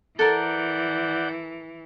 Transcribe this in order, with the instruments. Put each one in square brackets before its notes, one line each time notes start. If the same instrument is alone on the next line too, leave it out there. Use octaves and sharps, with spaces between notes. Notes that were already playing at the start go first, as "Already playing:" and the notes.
[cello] E3 [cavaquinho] A4 A#4 [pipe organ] D5 F#5 G6